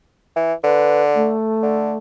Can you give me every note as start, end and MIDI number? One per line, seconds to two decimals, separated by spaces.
0.36 0.54 52
0.64 1.33 50
0.64 1.02 71
1.15 1.97 57
1.62 1.93 50